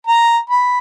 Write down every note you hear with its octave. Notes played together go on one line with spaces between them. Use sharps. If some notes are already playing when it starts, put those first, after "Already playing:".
A#5
B5